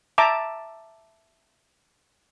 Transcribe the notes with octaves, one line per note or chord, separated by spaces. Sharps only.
E5 A5 A#5 D6